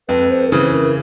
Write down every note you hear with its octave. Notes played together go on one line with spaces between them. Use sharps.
F2 B4
C5
A#4
C#3 E3 B4
A#4